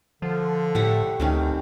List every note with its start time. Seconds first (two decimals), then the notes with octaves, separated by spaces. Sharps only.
0.22 D3 F3
0.75 A2 G4 E5 F#5
1.20 D2 C3 D#3 C#4